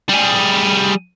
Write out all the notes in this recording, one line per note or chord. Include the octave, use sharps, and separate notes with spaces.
G3 G#4